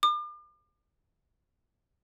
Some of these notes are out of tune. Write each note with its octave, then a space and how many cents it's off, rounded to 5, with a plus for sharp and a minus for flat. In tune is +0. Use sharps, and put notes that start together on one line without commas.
D6 +40